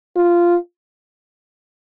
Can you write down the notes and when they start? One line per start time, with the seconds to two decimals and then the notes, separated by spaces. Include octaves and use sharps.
0.16 F4